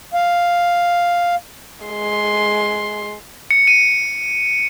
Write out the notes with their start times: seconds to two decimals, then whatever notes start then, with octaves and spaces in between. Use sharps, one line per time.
0.14 F5
1.86 G#3 C6
3.51 C#7
3.67 D#7